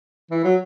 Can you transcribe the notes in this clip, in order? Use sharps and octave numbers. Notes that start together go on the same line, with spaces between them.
E3
F#3